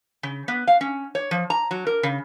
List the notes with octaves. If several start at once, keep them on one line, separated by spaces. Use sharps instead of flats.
C#3
B3
F5
C#4
C#5
F3
A#5
F#3
A#4
C#3